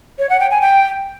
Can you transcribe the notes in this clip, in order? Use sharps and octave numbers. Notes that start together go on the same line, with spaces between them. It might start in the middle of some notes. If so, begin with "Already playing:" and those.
C#5
F#5
G5
G#5
G5